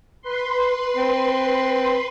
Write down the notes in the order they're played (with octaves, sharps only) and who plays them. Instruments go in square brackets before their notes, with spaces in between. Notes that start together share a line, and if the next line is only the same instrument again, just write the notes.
[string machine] B4 C6
[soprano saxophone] C4